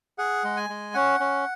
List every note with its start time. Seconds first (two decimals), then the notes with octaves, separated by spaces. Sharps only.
0.18 G#4 F#5
0.44 G#3
0.57 G#5
0.70 G#3
0.94 C#4 F#5
1.20 C#4